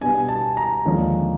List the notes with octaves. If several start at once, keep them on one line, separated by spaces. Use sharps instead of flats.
B2 G3 B3 D4 G#5
A5
A#5
D#2 D3 F3 G#3 C#4